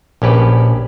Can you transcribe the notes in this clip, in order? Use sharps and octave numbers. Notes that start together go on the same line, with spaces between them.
A#1 C#4 G4 B4